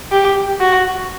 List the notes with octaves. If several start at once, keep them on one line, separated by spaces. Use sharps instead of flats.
G4
F#4